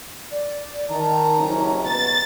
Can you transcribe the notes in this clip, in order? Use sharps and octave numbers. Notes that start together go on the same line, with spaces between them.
D5
D#3 A5 A#5
F#1 C2 C#4
B2 B3 A6